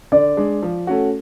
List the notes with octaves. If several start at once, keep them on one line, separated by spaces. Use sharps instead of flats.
D3 D5
G#3 D4
F3
A3 C#4 F#4